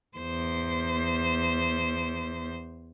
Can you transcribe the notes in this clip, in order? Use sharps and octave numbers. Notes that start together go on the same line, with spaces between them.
E2 C5